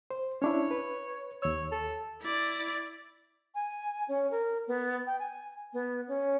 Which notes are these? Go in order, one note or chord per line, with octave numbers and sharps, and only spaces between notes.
C5
C#4 D4 E4 C#5
B4
D#2 C#5 E6
A4
E4 D5
G#5
C#4
A#4
B3
G5
G#5
B3
C#4